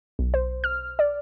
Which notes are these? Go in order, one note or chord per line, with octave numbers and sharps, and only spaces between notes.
B1
C5
F6
D5